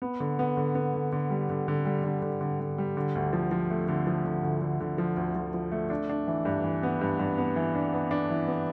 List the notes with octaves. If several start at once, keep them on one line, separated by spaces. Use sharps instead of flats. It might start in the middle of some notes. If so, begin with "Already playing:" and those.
B3
D3
B3
D3
B3
D3
D3
G3
D3
D3
G3
D3
D3
D3
D3
G3
D3
D2
F3
F3
A3
D3
F3
D3
D2
D3
D3
F3
D2
F3
F3
A3
D4
D4
E3
G2
E3
B3
G2
G2
B3
E3
D4
B3
D4
E3
B3